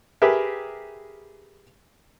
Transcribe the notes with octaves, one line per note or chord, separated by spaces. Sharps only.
G4 G#4 A#4 B4 E5